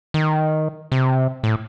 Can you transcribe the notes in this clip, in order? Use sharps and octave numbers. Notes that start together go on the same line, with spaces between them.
D#3
C3
A2